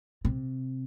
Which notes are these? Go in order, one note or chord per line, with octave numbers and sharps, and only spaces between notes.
C3